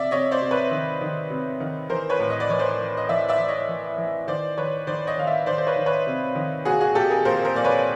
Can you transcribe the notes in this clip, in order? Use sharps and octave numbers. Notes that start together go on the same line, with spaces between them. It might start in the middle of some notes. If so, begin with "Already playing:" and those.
Already playing: C3 D5 E5
C3 C#5 D#5
C5 D5
C3
B4 C#5
D#3
D#3
C3
D#3
E3 A#4 C5
B4 C#5
A2
D#5
D5
E3 C#5
C5 D5
E3
D#5
E3 D5 E5
D5 E5
E3
C#5 D#5
E3
E3
D#3 C5 D5
D#3 B4 C#5
D#3 C5 D5
C#5 D#5
D#3 F5
D5 E5
D#3 C5 D5
C5
B4 C#5
D#3
B4 C#5
C3
D#3
A#2 F#4 G#4
F#4 G#4
A#2 G4 A4
G#4 A#4
A#2 A#4 C5
A#4 C5
A#2 D5
B4 C#5